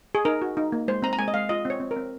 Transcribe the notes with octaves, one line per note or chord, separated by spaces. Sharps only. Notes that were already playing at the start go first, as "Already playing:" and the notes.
G#4
D#4 A#4
F#4
D#4
A#3
G#3 C5
C4 A#5
A#5
G#3 G#5
D#5
G#3 F5
F4 D#5
C4 C#5
C4
A#4
C4